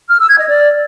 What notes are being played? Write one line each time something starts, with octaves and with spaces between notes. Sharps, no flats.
F6
E6
G#6
D#5
D5